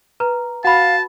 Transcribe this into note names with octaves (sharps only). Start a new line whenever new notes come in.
B4 A#5
F#4 F5 F#5 A5 B5